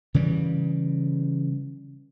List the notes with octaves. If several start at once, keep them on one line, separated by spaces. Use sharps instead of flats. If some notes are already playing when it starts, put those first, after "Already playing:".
C#3 E3 G3